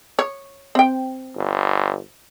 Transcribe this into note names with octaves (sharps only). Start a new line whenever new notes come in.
C#5
C4 G5
G1